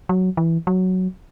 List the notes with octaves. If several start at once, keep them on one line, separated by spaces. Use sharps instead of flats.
F#3
E3
F#3